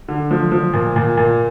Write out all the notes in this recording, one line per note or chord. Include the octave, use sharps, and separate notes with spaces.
D3
F3
F3
A#2
A#2
A#2